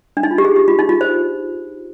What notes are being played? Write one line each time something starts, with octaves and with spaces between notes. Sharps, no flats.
D4
D#4
F4
G4
G#4
G4
F4
D#4
F4
C5